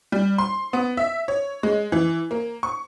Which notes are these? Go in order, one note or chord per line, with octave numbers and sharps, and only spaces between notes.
G3
C6
B3
E5
C#5
G#3
E3
A#3
C#6